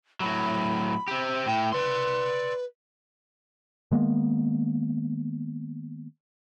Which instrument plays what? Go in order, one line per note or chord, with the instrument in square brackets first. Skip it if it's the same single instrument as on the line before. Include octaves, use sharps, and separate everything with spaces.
[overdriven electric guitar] A2 F#3 [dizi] B5
[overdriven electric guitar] C4 G4
[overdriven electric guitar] A2 [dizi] G5
[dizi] B4 [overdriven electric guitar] D5 C6
[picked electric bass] D#3 G#3 A#3 B3